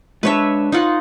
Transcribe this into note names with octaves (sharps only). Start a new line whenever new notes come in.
G#3 D4 B4 C#5 E5 A5
D#4 F4 F#5